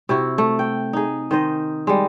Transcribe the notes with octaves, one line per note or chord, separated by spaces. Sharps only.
C3 E4 F#4
A3
G5
D#4 G#4
D#3 C5 D#5
G3 G#3